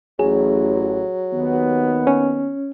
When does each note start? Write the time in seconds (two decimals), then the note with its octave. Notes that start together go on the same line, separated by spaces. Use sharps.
0.19 A1 F#3 G#4
1.33 D#2 D#3 B3
2.07 C#4